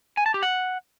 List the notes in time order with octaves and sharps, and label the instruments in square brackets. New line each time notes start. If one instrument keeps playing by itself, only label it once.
[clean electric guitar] G#5
A5
G4
F#5